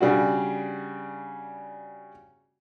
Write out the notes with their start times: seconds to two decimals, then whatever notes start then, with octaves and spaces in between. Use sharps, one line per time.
0.01 C#3 G3 D4 F#4